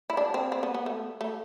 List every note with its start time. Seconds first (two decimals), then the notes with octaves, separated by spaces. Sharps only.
0.10 E4
0.17 D4
0.34 C4
0.52 C4
0.63 B3
0.74 B3
0.86 A3
1.21 A3